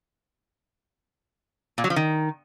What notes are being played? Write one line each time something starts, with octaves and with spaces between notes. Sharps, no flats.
A#2
F#3
F3
D#3